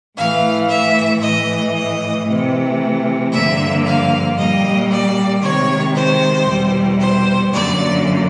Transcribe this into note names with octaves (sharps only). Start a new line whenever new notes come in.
A2 E3 A3 F5
E5
A2 E3 A3 D#5
D#5
C3 E3 A3
G2 D3 F3 A#3 E5
F5
A#2 G3 A#3 D#5
D5
C3 D#3 G#3 C#5
C5
E2 B2 G3
C5
F#2 D3 F#3 A#3 D5